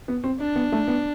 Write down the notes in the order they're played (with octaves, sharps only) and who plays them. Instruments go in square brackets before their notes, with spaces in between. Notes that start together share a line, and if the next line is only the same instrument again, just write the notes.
[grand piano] B3
C4
[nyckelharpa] D4
[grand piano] B3
A3
B3